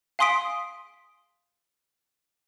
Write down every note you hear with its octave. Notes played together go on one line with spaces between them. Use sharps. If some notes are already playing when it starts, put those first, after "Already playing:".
F5 G#5 C6 D#6 B6 D7